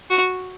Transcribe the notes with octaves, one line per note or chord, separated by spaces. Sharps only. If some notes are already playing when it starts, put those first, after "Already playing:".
F#4